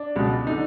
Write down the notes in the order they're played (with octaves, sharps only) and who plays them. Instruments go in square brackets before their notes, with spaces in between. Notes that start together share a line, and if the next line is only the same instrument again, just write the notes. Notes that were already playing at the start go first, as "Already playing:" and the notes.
Already playing: [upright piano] D4
C#2 B2
D3 D#4